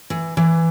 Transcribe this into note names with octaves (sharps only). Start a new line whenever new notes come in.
E3
E3